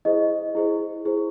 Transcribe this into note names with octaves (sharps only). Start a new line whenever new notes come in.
E4 G#4 C5 D#5
E4 G#4 C5
E4 G#4 C5